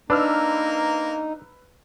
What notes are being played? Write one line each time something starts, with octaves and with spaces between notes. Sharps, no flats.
A#3 D4 D#4 B4 E6 F6